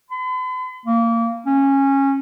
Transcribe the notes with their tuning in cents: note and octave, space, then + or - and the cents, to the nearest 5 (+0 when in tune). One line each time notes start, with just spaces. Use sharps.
B5 +45
A#3 -20
C#4 -15